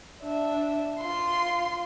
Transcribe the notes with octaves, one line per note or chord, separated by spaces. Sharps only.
D4 E5
F4 C6